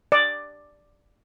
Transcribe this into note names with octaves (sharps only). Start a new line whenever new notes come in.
D5